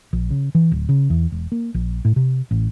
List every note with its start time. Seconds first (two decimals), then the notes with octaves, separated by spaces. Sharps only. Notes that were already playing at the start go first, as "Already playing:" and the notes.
0.13 A#1
0.30 C#3
0.55 E3
0.72 D1
0.89 C#3
1.10 E2
1.32 E1
1.52 A#3
1.74 A#1
2.05 A2
2.16 C3
2.51 A1